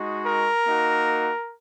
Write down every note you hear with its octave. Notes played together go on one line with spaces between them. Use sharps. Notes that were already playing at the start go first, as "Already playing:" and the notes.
Already playing: G#3 D#4 F#4
A#4
A#3 D#4 F#4